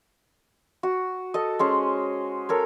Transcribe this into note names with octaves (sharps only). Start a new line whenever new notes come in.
F#4
A4 D#5
G#3 C#4 C5
A4 A#4 C#5